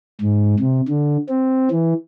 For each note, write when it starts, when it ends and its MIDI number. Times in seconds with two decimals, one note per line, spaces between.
0.21 0.55 44
0.60 0.81 48
0.88 1.17 50
1.29 1.69 60
1.71 1.94 52